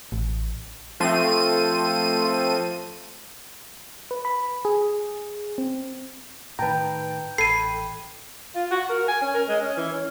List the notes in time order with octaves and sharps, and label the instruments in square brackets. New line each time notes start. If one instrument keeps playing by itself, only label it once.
[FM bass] A1
[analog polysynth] F3 A3 C4 D#7
[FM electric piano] B4
B5
G#4
C4
[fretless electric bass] A2 D#3 [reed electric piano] B4 A5 A#5 [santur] G5
[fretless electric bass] A1 [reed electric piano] A4 G#6 [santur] B5 [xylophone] C7 D#7
[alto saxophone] F4
F#4
A#4
G#5
C#4
A#4
G#3
C#4
E3
C#4